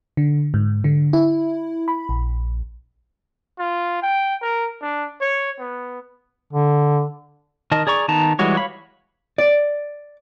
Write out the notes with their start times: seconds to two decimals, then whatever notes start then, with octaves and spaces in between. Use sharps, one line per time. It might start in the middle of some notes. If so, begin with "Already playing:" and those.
0.17 D3
0.54 G#2
0.84 D3
1.13 E4
1.88 B5
2.09 A#1
3.58 F4
4.02 G5
4.42 A#4
4.82 D4
5.21 C#5
5.59 B3
6.53 D3
7.72 D#3 A#4 D#5 A5
7.87 G#4 D5 A#5 C#6
8.08 D#3 B3 D#4 A5 A#5
8.39 E3 G3 G#3 F#4 C#5
8.57 C#5 F5 B5
9.38 D5